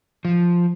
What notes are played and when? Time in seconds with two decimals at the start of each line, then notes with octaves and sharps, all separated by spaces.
0.25 F3